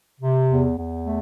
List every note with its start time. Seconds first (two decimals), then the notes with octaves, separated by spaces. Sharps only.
0.20 C3
0.48 E2
0.77 E2
1.05 A3